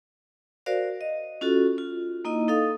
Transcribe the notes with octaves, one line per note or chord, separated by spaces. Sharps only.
F#4 A#4 C5 D5 F5
D#5
C#4 F4 F#4 A4
F4
A#3 D#4 E4 D#5
D#4 A4 D#5 F5 D#6